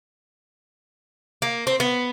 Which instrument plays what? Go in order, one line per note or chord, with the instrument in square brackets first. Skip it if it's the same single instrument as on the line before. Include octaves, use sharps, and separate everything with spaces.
[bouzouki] A#3
C4
B3